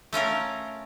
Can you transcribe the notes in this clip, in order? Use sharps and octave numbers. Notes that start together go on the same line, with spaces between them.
A3 C#4 F4 A#4